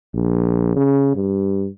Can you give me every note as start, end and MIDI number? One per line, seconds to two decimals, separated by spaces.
0.14 0.72 34
0.76 1.11 49
1.16 1.68 43